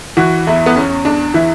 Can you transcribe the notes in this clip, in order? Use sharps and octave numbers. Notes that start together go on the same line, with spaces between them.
E3 F#4
E2 E4
B3
E2 C#4
E2 D4
E3 E4